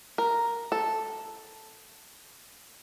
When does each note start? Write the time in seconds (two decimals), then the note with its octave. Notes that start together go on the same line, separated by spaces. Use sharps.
0.18 A#4
0.72 A4